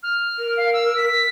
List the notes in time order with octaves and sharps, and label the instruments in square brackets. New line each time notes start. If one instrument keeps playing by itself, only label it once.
[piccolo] F6
[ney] A#4
[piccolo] F5
E6
B6